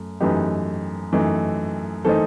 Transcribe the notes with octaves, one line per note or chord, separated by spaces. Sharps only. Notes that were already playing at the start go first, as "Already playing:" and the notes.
Already playing: F#2 A3
F#2 E3 A3 D#4 G4 B4
F#2 E3 A3 D#4
E3 A3 D#4 A4 C5